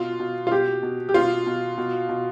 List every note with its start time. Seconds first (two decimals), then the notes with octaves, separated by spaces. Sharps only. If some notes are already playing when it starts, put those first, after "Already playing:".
Already playing: B2 F4
0.20 B2
0.47 F4
0.51 B2 G4
0.83 B2
1.09 G4
1.14 B2 F4
1.47 B2
1.78 B2
2.09 B2